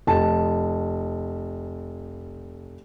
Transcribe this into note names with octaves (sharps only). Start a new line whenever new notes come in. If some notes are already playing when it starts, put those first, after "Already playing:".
F1 A5